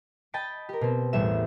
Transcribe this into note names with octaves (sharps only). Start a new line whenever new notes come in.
D#5 G5 A5 B5 A6 D7
G4 A#4
B2 C4
A1 E2 G3 E5 E7